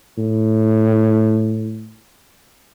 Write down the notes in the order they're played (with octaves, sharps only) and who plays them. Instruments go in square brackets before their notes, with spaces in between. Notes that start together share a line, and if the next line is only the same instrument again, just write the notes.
[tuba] A2